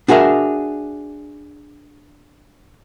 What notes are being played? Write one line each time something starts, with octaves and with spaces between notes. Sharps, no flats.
D4 F#4 G#4 A#4 E5